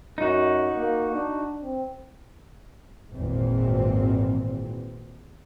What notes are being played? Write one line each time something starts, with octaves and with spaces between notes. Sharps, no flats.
F#2 D#4 F#4
A#3
D4
C4
G#1 E2 A#2 C4